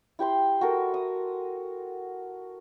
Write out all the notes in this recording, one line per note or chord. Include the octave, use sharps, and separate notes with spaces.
E4 G4 G5 C6
F#4 A4 A#4
D#6